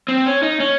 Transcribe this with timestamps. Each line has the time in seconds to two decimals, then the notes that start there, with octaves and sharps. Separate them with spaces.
0.08 C4
0.26 C#4
0.43 D#4
0.60 C#4